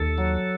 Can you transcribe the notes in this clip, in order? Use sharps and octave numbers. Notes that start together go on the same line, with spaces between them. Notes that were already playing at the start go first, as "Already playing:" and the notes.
Already playing: D#2 A4
F#3